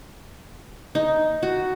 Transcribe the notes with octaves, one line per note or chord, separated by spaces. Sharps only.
D#4
F#4